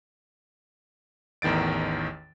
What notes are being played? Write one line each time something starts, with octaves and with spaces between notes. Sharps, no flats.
A1 E2 D#3 A6 D7